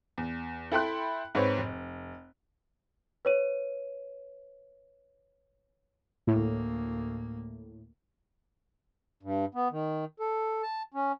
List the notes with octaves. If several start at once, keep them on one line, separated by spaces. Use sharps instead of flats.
E2
E4 A4 G5 B5 C6 F#6
G#2 C4 B4 C#5
F1
B4 C#5 D#7
D2 A2 A#3
G2
B3
D#3
A4
A5
C#4